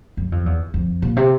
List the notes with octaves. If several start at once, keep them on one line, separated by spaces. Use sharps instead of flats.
F#2
F2
E2
F2
A#2
C3